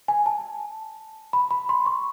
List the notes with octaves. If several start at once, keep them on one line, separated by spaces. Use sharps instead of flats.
G#5
A5
B5
B5
C6
C#6